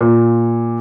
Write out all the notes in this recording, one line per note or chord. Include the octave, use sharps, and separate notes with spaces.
A#2